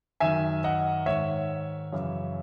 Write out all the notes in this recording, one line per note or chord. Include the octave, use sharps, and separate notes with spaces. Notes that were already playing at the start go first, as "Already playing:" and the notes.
F#2 D#3 E5 G#5
D#5 F#5
G#2 D#3 C#5 E5
F#2 C#3 E3